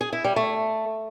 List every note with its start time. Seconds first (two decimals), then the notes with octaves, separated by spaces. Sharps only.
0.01 G#4
0.13 E4
0.24 G3
0.36 A3